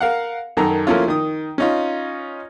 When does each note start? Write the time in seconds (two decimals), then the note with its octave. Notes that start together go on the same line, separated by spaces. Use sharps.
0.01 A#4 F5 F#5
0.57 F#2 D#3 A4 A#5
0.87 F3 A3 A#3 C#4 E4 F4
1.08 D#3 D#6
1.58 C#4 D#4 F4